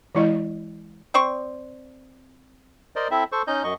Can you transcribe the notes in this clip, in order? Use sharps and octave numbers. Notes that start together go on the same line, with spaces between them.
E3 G#3 E4 D5 D#5
C4 C5 D5 C#6
A#4 C5 D5 D#5
C4 E4 A4 E5
A4 C5 C#6
C#4 D#4 D#5 G6
F#2 D#5 C#6